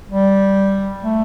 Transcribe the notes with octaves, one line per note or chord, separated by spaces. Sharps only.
G3
A3